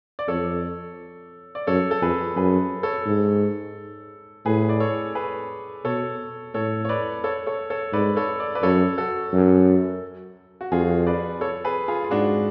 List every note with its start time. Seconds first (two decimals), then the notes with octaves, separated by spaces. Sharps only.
0.19 D5
0.28 F2 A4 C#5
1.55 D5
1.67 F#2 A4 C#5
1.91 A4
2.02 F2 G#4 B4
2.36 F#2 G#4 B4
2.83 A4 C#5
3.06 G#2
4.46 A2 G#4 B4
4.69 D5
4.80 A4 C#5
5.15 G#4 B4
5.85 B2 A4 C#5
6.54 A2 A4 C#5
6.85 C#5
6.89 B4 D5
7.24 A4 C#5
7.47 A4 C#5
7.70 A4 C#5
7.93 G#2 B4 D5
8.16 A4 C#5
8.40 D5
8.55 B4 D5
8.63 F#2 A4 C#5
8.98 F#4 A4
9.33 F#2
10.61 F#4
10.72 F2 F4 G#4
11.07 B4 D5
11.41 A4 C#5
11.64 G#4 B4
11.88 F4 G#4
12.04 F4
12.11 G#2 D4 F#4